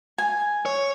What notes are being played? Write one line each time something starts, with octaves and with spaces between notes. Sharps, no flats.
G#5
C#5